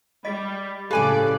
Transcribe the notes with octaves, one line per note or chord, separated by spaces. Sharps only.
G3 D#5 B5 A6
A2 C#3 G4 A4 B4 D5 G#5 D6